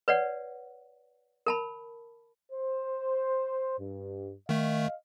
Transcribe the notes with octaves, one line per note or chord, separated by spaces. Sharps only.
B4 C#5 D5 F#5
A#4 A5 B5
C5
G2
D#3 A3 D#5 F5